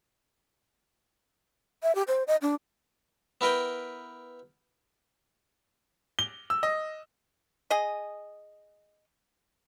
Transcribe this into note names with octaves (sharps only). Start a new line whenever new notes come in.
E5
G4
C5
D#5
D4
B3 E4 A#4 B4 G5
G7
E6
D#5
G#4 D#5